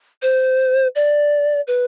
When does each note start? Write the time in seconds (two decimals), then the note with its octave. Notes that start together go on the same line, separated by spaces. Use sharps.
0.22 C5
0.96 D5
1.67 B4